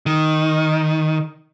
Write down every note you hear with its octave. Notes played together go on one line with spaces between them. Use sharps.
D#3